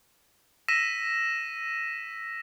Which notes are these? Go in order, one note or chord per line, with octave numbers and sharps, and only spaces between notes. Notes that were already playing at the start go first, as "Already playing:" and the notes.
E6 A#6 B6 D#7 E7